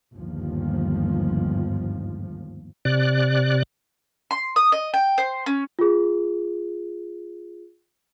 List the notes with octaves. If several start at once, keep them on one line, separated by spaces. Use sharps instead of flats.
G1 D#2 G#2 F3
C3 D5 F#6
C6
D#6
D#5
G5
C5
C#4
F4 G#4